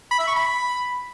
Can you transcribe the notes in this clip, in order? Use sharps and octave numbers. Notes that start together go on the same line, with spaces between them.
B5
E5
C#6
B5